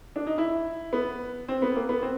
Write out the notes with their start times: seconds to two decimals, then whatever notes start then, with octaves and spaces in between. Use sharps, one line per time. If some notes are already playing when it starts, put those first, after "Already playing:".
0.16 D4
0.27 D#4
0.38 E4
0.93 B3
1.48 C4
1.62 B3
1.75 A#3
1.89 B3
2.02 C4